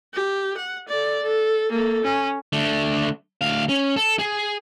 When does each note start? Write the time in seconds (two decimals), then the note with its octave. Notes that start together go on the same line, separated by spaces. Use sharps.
0.13 G4
0.57 F#5
0.88 A4 D5
1.22 A4
1.71 A#3 A4
2.04 C#4
2.53 D3 A3
3.41 D2 F5
3.69 C#4
3.96 A4
4.19 G#4